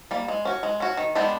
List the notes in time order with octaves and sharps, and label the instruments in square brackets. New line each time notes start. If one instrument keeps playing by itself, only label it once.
[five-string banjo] G3 A#3
G#3
C#4 F#4
G#3
C#4 F#4
D#3
G#3 B3 D4 G4